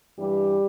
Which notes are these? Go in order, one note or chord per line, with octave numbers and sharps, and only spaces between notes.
G2 E3 G3 G4